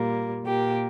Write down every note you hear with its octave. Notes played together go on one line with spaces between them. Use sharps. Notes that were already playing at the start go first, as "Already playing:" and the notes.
Already playing: A#2 G3 A#3
A#2 A#3 G4